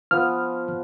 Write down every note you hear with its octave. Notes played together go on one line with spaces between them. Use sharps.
F3 B3 F6